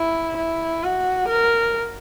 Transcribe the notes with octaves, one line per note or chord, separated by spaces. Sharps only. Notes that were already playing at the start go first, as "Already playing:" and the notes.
Already playing: E4
E4
F#4
A#4